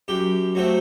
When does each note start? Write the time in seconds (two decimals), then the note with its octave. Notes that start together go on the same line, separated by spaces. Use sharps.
0.08 F#2 G4
0.55 F#3 A3 C4